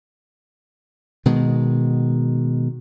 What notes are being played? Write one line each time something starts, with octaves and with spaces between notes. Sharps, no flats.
B2 D#3 G#3